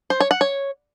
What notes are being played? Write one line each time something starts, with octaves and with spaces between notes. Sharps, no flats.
C5
C#5
F#5
C#5